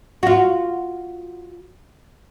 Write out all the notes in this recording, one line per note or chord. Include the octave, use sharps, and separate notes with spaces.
F4 F#4